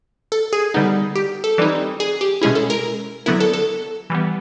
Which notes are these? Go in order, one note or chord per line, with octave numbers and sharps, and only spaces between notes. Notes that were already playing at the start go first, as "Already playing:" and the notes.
A4
G#4
D3 G3 B3 D#4
G4
A4
E3 G3 C4 D#4
G#4
G4
B2 G#3 C#4 E4 G#4
A4
A#4
D3 F#3 B3 E4 A#4
A4
A4
E3 G3 B3